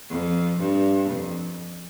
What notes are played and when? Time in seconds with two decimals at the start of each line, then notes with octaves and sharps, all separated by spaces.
0.10 F2
0.60 G2
1.12 F2